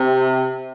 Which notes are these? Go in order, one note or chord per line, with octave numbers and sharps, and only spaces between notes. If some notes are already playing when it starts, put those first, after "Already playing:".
Already playing: C3